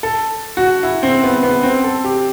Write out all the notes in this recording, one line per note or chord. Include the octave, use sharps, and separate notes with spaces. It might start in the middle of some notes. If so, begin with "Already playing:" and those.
A4
F#4
E4
C4
B3
B3
C4
A4
G4